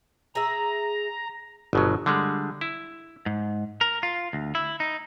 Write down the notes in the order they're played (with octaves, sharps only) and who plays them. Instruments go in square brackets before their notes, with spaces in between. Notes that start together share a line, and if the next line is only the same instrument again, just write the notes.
[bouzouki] G#4 E5 [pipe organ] A#5
[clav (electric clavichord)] G1 B2 F#3
D3 G3 G#3
E4
[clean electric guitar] G#2
A#4
F4
D2
E4
D#4